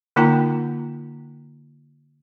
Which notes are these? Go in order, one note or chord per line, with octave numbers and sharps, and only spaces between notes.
D3 A#3 D#4 F4 G5 A#5